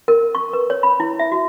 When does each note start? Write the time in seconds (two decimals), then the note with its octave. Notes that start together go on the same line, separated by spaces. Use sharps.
0.08 A#4
0.35 C#6
0.53 B4
0.70 C#5
0.83 B5
1.00 E4
1.19 E5
1.32 F#4